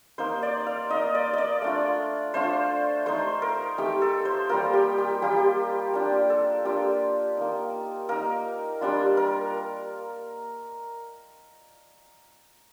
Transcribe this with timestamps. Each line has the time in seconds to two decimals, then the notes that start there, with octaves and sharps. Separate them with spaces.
0.18 A#3 D#4 C5
0.43 D5
0.66 F5
0.90 A#3 D#4 D#5
1.15 D5
1.33 D5 D#5
1.62 A3 D4 F4
2.34 A3 D4 F4 C5
3.06 A3 D#4 C5
3.42 A#4
3.78 A3 D#4 G4
4.01 A4
4.25 C5
4.49 G3 A#3 F4 A#4
4.73 G4
4.98 G4
5.22 G3 A#3 F4 G4
5.93 A#3 D4 F4 G4
6.30 A4
6.65 A#3 D4 F4 G4
7.37 A#3 D#4
8.09 A#3 D#4 A#4
8.81 G3 D4 F4
9.17 A#4